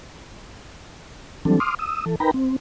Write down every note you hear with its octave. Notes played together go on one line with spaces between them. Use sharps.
E3 F#3 G3 C4 D4 A4
C6 D6 D#6 F6
D#6 E6
E3 A4
D#4 A#4 B4 G5 A#5 B5
C4